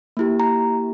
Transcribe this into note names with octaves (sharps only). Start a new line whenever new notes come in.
A#3 E4 G4
A#5